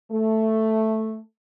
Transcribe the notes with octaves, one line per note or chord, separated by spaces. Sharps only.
A3